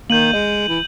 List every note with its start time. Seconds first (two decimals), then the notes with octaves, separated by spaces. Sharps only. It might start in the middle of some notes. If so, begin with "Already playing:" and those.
0.10 D#3 A#3 G6 D#7 F#7
0.33 G#3 D#5
0.68 E3